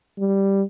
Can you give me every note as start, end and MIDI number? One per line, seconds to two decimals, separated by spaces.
0.19 0.62 55